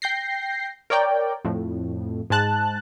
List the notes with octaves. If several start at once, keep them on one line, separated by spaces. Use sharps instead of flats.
G5 G6 A#6 C7
A#4 C#5 D5 G5
F2 A2
G#2 G#3 A5 F#6